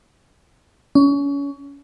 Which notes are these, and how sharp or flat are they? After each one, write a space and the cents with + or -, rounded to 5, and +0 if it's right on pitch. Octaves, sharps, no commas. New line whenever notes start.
C#4 +30